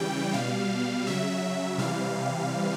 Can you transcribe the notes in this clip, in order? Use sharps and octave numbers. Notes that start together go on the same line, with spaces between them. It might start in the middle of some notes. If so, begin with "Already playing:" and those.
Already playing: C#3 E3 G3 G5
B2 G3 F5
C#3 F#3 E5
C3 E3 G3 F5